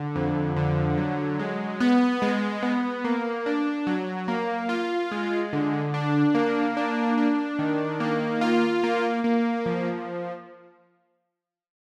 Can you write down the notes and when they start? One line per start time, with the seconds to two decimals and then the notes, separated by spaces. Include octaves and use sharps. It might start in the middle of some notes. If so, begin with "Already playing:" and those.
Already playing: D3
0.15 F2
0.56 D3
0.97 F#3
1.39 G#3
1.80 B3
2.22 G#3
2.63 B3
3.04 A#3
3.46 D4
3.87 F#3
4.28 A#3
4.69 F4
5.11 G#3
5.53 D3
5.94 D4
6.35 A#3
6.77 D4
7.17 D4
7.59 D#3
8.00 A#3
8.41 F4
8.83 A#3
9.24 A#3
9.66 F3